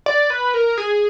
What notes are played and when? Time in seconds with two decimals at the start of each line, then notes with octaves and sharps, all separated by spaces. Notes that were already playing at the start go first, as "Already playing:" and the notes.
0.06 D5
0.30 B4
0.54 A#4
0.78 G#4